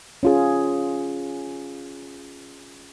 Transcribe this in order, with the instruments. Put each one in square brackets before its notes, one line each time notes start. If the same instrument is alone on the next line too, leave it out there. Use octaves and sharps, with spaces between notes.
[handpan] C#4 F4 G#4